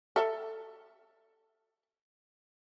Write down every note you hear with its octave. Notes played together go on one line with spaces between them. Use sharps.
A4 E5